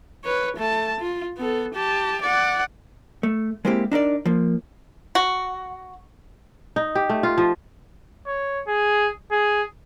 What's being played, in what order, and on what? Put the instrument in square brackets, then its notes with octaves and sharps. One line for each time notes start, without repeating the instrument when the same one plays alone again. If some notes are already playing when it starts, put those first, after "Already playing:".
[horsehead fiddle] B4 C#5
A3 A5
F4
B3 A4
G4 A5
D5 F#5
[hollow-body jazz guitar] A3
G#3 A#3 C4 E4 G4
D4 D#4 A#4 D5
F3 A#3
[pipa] F#4
[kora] D#4
G4
A3
F4
F3
[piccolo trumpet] C#5
G#4
G#4